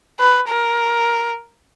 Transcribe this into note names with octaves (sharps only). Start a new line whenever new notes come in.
B4
A#4